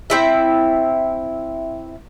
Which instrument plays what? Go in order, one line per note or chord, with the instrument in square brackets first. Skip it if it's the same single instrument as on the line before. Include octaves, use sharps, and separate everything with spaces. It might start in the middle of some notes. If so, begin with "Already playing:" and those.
[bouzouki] C4 E4 E5